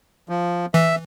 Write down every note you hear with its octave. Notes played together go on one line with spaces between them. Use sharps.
F3
E3 E5